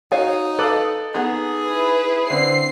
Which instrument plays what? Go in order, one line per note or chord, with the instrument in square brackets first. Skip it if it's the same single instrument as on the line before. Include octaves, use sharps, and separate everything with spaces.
[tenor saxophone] D#4 [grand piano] F#4 [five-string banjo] C#5 F5 G#5
[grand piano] A4 D6 F#7 [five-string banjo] B4 F5
[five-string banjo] B3 D#4 [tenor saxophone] G#4
[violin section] E4 B4
[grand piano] D3 C4 [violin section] C7